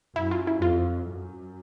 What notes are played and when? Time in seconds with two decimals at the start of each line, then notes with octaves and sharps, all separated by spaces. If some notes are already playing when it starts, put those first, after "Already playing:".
0.16 F#2 E4
0.31 F4
0.47 E4
0.62 F2 F4
1.08 F#2